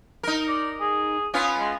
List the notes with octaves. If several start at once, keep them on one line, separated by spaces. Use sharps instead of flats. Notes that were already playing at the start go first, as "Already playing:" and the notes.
D#4 A#4
D5
G#4
B3 C#4 F4
G#3